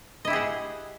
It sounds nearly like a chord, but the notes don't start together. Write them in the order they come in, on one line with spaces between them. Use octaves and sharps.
D#5 E4 G4 G#4 F#5